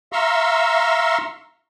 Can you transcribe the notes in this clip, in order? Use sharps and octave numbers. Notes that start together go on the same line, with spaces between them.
E5 F5 A#5 C6 C#6 E6